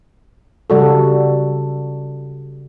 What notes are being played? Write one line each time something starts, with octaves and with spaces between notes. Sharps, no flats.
C#3 G3 F#4 A4